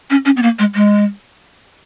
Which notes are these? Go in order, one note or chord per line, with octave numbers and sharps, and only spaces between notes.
C#4
C#4
B3
A#3
G#3
G#3